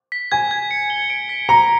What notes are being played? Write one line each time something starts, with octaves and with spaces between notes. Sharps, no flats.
B6
G#5 G#6
G#6
C#7
G7
D7
B6
A#5 C#7